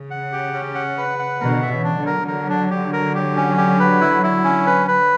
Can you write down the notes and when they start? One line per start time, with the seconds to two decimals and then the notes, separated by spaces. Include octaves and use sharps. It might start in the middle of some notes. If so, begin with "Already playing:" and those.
Already playing: C#3
0.11 F#5
0.32 G4
0.53 C#4
0.75 F#5
0.98 B4
1.19 F#5
1.41 B2 D3 A#4
1.62 E5
1.70 C#3 E3
1.84 D4
1.99 D3 F#3
2.06 A#4
2.28 D3 F#3 A#4
2.49 D4
2.71 G4
2.93 A#4
3.15 G4
3.37 C#4
3.58 G4
3.80 B4
4.01 E4
4.24 E4
4.44 C#4
4.66 B4
4.88 B4